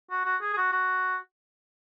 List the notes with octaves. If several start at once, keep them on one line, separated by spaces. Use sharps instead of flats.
F#4
F#4
G#4
G#4
F#4
F#4